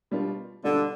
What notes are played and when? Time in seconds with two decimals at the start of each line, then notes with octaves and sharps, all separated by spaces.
0.11 B2 G3 D4 F4
0.64 B2 D3 G3 D4 F4